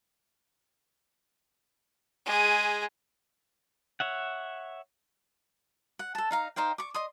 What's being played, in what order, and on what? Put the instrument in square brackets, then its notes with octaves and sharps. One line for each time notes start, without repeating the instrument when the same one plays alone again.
[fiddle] G#3 G#4
[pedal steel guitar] C#5 E5 F#5
[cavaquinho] F#5
A4 A5
D#4 F5 A#5
D#4 C5 F5 G5
C#6 D6
D#5 C6 D#6